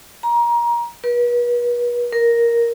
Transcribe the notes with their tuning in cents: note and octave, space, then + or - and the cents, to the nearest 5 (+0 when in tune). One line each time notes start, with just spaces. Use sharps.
A#5 +25
B4 -40
A#4 +5